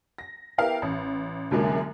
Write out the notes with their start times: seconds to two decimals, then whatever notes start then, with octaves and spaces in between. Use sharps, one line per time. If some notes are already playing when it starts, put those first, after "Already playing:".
0.18 A#6
0.58 B3 E4 G4 A#4 F5
0.82 A1
1.51 C2 F#2 D3 F#3 G#3 A#3